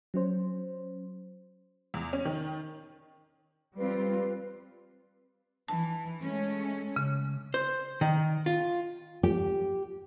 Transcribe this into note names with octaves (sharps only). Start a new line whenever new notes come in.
F#3 C#4 C5
E2
C#4
D#3
G3 C4 F4 B4
E3 A5
G#3 A3 C#4
C#3
C5
D#3
F4
G4